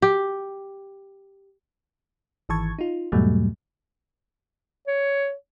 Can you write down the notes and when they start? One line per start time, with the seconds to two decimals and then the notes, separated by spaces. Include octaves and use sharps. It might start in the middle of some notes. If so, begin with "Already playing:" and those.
0.02 G4
2.49 G#1 D#3 E3 A5 C#6 G#6
2.79 D#4 F4
3.12 E2 G#2 B2 F#3 G3 A3
4.87 C#5